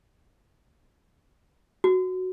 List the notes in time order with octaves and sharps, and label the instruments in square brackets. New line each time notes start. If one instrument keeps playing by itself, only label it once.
[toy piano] F#4